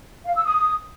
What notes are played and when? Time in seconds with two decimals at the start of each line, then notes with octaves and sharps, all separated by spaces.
0.25 F5
0.34 E6
0.44 D#6